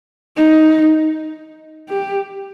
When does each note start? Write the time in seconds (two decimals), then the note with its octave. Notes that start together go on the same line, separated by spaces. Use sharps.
0.37 D#4
1.89 G4